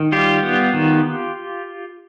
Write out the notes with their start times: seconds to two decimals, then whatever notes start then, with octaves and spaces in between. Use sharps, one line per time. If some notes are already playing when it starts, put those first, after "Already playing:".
Already playing: D#3
0.12 G3 F4 G4
0.43 B3
0.74 D#3